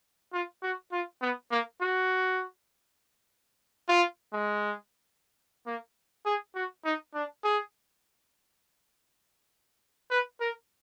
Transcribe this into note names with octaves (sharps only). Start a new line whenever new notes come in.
F4
F#4
F4
B3
A#3
F#4
F4
G#3
A#3
G#4
F#4
D#4
D4
G#4
B4
A#4